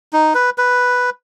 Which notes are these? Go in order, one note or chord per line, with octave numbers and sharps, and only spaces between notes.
D#4
B4
B4